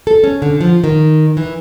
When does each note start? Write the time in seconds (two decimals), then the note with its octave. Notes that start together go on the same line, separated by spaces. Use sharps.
0.07 A4
0.24 C#4
0.42 D3
0.61 F3
0.84 D#3
1.37 E3